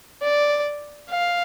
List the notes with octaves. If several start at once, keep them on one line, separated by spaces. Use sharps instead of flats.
D5
F5